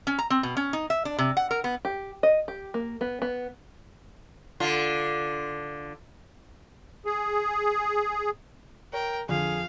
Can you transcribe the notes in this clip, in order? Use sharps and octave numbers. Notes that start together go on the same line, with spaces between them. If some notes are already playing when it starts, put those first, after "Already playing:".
C#4
A#5
C4
B2
C#4
D#4
E5
D4
C3
F#5
A#4
B3
G4
D#5
G4
A#3
B3
B3
D3 F4
G#4
A#4 C#5 G5
F2 D3 G#4 F5